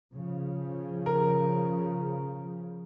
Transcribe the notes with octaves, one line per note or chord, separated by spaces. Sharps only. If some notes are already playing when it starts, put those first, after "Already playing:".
C#3 F3
A#4